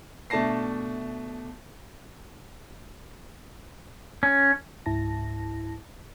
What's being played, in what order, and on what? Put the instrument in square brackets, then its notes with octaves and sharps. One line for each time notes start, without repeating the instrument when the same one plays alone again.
[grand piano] B2 A3 D4 A5 A#6 C7
[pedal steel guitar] C#4
[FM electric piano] C#2 G#2 E4 A5 A#6